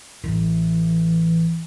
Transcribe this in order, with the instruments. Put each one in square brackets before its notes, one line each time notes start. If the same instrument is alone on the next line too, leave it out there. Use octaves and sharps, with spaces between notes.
[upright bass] A1 E3